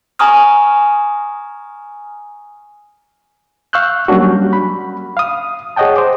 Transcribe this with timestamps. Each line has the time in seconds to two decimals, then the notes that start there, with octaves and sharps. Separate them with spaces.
0.19 G#5 A#5 C#6 D#6 F6
3.73 F5 C#6 E6 F#6 G6
4.08 F#3 G3 A#3 C#4 D4 F#4
4.53 B5
5.17 F5 D#6
5.76 G#4 C#5 D#5 F#5 G5 A5
5.96 C5 D6